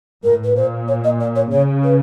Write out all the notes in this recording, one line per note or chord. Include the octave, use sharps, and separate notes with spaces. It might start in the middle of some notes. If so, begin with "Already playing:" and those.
A2 A#4
B4
A#2 C5
C#5
D#5
D5
C#5
C#3 C#5
B4